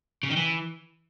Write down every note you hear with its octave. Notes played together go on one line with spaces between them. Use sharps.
C#3
D#3
E3